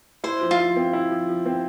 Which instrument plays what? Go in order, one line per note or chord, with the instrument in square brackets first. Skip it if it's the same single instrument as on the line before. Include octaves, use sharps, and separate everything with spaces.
[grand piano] E4 [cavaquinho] C5
[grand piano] F3
[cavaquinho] F4
[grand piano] F3
C4
E4
F3
F3
C4